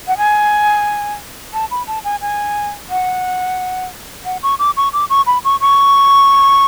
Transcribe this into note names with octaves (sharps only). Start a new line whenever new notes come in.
F#5
G#5
A5
B5
A5
G#5
G#5
F#5
F#5
C#6
D6
C#6
D6
C#6
B5
C#6
C#6